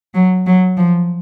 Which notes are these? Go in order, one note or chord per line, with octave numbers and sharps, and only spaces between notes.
F#3
F#3
F3